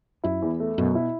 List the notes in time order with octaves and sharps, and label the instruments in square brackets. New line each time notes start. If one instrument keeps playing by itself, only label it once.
[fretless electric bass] F#2 [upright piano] E4
[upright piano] E2
A3
[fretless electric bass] F#2 [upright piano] B2
[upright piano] E4